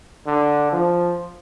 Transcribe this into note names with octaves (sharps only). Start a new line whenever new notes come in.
D3
F3